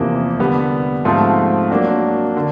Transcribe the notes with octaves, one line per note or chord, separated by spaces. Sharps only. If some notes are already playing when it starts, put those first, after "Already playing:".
Already playing: E2 C3 F3 A#3
D3 G3 B3
G#2 F3 A3 C4 F4
F#3 A#3 D4 F#4
D3